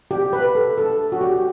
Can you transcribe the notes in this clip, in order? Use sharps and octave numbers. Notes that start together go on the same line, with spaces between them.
G4
B4
A4
A4
F#4
G4